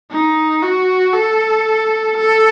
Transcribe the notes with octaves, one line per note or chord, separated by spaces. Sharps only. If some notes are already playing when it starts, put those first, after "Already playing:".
D#4
F#4
A4
A4